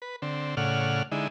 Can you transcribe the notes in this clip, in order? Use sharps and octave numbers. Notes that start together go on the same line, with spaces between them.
B4
D3 C4
A2 C#3 D5 F#5 F6
D3 G#3 D#4 E4